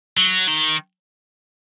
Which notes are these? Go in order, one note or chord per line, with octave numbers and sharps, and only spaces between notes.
F#3
D#3